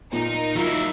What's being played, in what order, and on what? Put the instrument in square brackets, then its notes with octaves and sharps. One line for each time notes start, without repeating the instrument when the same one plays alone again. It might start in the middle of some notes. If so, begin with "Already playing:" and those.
[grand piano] A#2 [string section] D#4 A#4
[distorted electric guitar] F#3 E4 [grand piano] F4